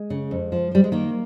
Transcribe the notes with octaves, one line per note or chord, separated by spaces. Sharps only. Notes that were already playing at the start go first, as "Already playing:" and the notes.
Already playing: G#3
C#3
F2
F3
F3 G3
G#3
D#3 A#3